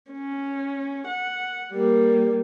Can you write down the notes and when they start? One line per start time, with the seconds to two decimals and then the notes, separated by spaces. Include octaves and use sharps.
0.11 C#4
1.07 F#5
1.72 G3 A#3